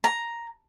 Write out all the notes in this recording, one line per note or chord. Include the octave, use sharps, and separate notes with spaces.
A#5